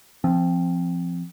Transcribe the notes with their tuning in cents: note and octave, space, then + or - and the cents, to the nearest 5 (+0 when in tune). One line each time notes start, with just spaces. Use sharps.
F3 -20 C4 +0